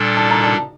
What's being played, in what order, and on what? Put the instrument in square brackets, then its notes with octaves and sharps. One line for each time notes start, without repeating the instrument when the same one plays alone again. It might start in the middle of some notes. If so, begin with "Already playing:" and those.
Already playing: [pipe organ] A#2 G3 D4 A4
[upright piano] A5
A#5
A5